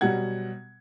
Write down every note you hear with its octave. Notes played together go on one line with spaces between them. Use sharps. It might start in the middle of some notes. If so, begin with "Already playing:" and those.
B2 F#3 G3 F#5 G#6